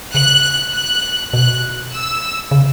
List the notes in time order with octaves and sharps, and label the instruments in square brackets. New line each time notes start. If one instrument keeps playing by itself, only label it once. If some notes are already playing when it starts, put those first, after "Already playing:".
[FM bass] C#3 [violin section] F#6
[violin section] F#6
[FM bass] B2 [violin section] F#6
[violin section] E6
[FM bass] C#3